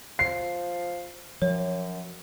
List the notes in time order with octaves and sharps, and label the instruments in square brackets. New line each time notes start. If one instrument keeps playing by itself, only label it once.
[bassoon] F3 [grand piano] C7
[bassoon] F#2 [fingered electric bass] F3 [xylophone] C#5